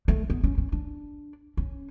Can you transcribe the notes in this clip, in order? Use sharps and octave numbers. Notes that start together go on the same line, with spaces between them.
A3
B3
C#4
C#4
D4
C#4